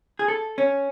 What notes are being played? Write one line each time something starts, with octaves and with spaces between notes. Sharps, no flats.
G#4
A4
C#4